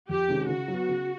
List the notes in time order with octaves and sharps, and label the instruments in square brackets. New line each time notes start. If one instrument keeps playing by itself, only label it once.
[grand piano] F2 [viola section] G4
[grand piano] C3 D#3 G#3 C#4
[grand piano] C#3 [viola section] F#4
[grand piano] F#3 B3
C#3